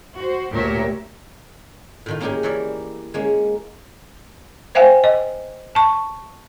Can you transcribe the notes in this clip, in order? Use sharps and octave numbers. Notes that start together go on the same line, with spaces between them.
F#4 C5
D2 A#2 G4 A#4 C#5 E5
A2 D#3 F4
A#3 C#4 D#4 G4 G#4 A#4
E3 A#4 C#5 D5 E5
G#3 A#3 C#4
C5 E5 F5 G5 G#5
D#5
A5 C#6